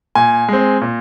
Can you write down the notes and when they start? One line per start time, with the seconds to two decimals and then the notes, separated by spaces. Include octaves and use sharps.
0.15 A#2 G#5
0.48 G#3 C4
0.81 A#2